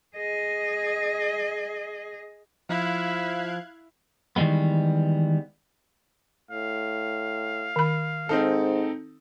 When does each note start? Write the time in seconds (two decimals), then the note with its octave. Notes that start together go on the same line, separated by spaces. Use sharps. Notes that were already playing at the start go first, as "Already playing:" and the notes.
0.17 G#4 D#5
2.69 F3 E4 F5 F#6 G#6
4.36 D#3 E3 G3 G#3 B3
6.51 A2 F5
7.76 D#3 B5
8.29 G#2 C4 D#4 A4